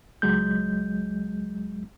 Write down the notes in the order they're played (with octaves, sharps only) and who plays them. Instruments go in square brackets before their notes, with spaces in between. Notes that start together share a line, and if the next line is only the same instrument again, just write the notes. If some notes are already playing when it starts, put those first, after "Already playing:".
[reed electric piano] C#2 F#3 G#3 G6